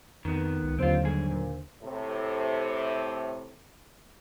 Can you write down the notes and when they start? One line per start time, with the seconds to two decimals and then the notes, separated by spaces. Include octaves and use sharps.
0.25 F2 D#3 B3
0.64 C#2
0.79 D#2 D3 F#3 C4 F4 C5
1.04 G2 G#4
1.31 A#2
1.82 A2 C3